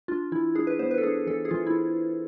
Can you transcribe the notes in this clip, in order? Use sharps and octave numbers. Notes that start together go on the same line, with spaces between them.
D4 F4
E3 E4
D4 G#4
B4
B3 C5
B4
A4
D4 G#4
E3 A4
G#4
E3 F4
E4